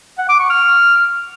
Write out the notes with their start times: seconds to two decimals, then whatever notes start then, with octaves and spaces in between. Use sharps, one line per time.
0.18 F#5
0.29 D6
0.39 C#6
0.50 F6